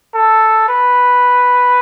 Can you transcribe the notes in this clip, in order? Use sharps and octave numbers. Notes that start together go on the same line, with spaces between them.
A4
B4